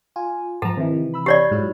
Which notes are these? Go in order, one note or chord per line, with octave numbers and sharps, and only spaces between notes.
F4 G#5
G#2 F3 A4 A5 A#5
C3 D#3 E3
B5 E6
G4 C#5 D5 B5 A6
G#2 F#3 E4